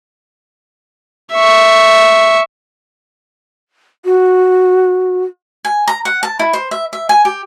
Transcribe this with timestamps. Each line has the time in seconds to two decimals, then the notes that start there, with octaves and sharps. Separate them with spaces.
1.33 E5 C#6
4.05 F#4
5.65 G#5
5.88 A#5
6.05 F#5
6.23 A5
6.39 E4
6.53 C5
6.71 E5
6.93 E5
7.09 G#5
7.25 G4